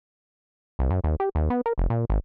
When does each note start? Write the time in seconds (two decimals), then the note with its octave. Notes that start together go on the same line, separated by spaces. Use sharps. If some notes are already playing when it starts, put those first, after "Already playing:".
0.79 C2
0.90 F#2
1.04 D#2
1.20 G4
1.35 D#2
1.50 B3
1.66 A#4
1.78 F1
1.90 A#2
2.10 G#1